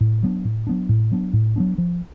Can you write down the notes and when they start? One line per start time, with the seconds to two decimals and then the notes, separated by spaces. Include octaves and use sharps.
0.01 A2
0.23 F#3 B3 D4
0.45 A2
0.67 F#3 B3 D4
0.89 A2
1.12 F#3 B3 D4
1.33 A2
1.56 F#3 B3 D4
1.78 F3